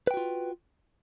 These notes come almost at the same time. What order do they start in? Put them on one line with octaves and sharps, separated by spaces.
B4 G5 F#4 F4